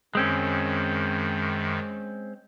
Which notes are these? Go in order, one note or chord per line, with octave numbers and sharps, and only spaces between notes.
F#2 D#3 G#3 C4 C#4